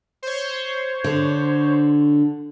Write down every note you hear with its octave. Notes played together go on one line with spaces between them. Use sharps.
C5 C#5
D3